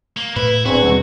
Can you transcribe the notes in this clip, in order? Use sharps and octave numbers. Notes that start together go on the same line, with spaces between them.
A#3
A2 E4 B4
D#1 E2 C4 D4 F#4 G#5
D#2 B2 G3 C4